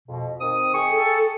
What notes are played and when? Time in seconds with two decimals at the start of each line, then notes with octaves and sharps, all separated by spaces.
0.07 F2 B2
0.40 D#3 C4 D#6
0.73 G#4 G5 C#6
0.91 A4